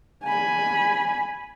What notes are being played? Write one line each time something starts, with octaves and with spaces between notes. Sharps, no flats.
G#5 B5